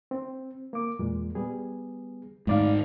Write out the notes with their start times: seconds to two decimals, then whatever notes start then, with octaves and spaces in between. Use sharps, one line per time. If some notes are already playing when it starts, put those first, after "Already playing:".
0.11 C4
0.73 A#3 D6
0.99 E2 A#2 G#3
1.35 G3 B3 G#4
2.47 G#2 D#3 A3 D5 F5